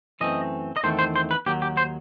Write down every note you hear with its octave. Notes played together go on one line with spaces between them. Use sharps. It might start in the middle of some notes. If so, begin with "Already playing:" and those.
F#2 E3 A3 C4 D#5
D#5
E2 D#3 A3 C4 C5
C5
C5
B4
D#2 D#3 F#3 G4
G4
C5